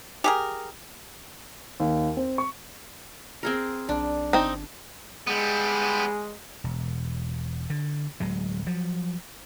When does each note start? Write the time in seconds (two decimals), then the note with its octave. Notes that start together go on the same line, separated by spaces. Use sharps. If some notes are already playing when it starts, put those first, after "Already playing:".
0.24 G4 G#4 A#4
1.80 D#2
2.17 C4
2.38 C#6
3.43 C4 G#4 A#4
3.89 B1 D4
4.33 G1 C4 D#4
5.27 G3 G#3 B3
6.64 E1
7.70 D3
8.20 D1 F#3 G#3
8.66 F3 F#3